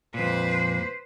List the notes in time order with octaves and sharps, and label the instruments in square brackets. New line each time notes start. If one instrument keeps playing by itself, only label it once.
[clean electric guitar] F2 A#2 [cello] B4 C5